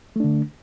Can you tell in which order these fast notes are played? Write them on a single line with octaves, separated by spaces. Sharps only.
A3 D4 D3